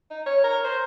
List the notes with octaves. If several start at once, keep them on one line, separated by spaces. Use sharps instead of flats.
D#4
C#5
A#4
C5